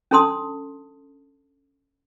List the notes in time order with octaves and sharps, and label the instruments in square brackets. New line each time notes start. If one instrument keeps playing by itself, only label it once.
[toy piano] C#4 D4 A4 A5 C6 D#6